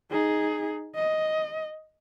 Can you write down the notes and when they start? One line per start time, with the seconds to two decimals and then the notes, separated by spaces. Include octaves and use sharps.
0.11 D#4 G#4
0.96 D#5